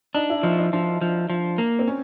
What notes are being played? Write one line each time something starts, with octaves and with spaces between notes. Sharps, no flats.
D4 D#4
E4
F3 D#4
D#4
F3 D4
F3
F3
A#3
C4
C#4